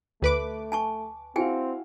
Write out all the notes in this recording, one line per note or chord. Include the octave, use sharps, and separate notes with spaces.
D2 A3 B4 D6
G#5 A5 C#6
C4 E4 F#4 G#4 F5 G5 G#5